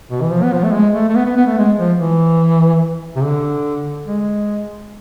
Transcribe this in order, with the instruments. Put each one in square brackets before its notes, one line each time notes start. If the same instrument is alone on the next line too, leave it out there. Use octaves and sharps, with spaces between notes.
[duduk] B2
E3
F3
B3
F3
A3
G#3
A3
A3
B3
B3
B3
A3
G#3
F3
E3
C3
D3
G#3